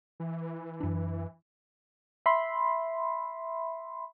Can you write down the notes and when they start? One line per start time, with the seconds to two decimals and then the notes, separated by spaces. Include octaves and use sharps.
0.20 E3
0.80 F#2 D4
2.26 E5 B5 C6